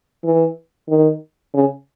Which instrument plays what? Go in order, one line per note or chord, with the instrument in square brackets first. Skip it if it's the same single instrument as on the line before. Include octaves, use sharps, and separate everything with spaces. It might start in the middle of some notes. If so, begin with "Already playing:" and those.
[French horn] E3
D#3
C#3